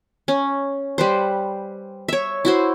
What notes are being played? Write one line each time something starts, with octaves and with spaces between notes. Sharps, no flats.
C#4
G3 B4 C5
C#5 E5
E4 F#4 C5